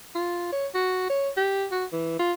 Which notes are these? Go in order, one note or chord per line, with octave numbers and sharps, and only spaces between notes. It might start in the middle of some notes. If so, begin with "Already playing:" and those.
F4
C#5
F#4
C#5
G4
F#4
E3
F4